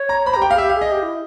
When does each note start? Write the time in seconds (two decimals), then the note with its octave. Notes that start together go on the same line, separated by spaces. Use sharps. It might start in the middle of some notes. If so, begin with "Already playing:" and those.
Already playing: C#5
0.09 A#5
0.26 C5 B5
0.33 G4 A#5
0.42 G5
0.48 G4
0.51 G#4 F5
0.58 G4 E5
0.69 F5
0.75 G#4
0.81 D#5
0.92 G4
1.03 E4